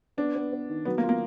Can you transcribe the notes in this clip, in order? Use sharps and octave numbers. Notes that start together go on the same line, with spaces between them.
B3 D4
B3
B3
D#3
F#3 B3
A#3
F4
A#3